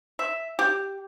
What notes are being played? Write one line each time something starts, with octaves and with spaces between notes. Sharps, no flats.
E5
G4